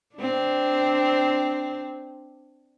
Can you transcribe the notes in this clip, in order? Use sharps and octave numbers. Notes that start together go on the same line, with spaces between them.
C4 D4